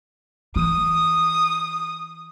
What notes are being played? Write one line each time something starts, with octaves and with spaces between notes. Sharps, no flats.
E3 D#6